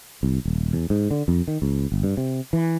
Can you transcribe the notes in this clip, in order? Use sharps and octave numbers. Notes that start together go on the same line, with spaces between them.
C2
D#1
E2
G#2
D3
F2
D#3
C#2
G1
G2
C3
E3